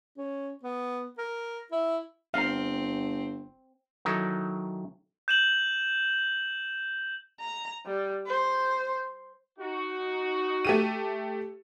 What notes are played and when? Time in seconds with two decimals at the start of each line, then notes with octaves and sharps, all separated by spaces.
0.18 C#4
0.63 B3
1.18 A#4
1.72 E4
2.34 G1 C4 F5 A#5
4.05 D#3 F#3 D#4 E4 A4
5.28 G6 E7 F#7
7.40 A#5
7.86 G3
8.27 C5
9.59 D#4 F#4
10.65 A3 G4 D#7